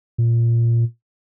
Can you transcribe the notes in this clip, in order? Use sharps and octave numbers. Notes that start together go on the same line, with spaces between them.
A#2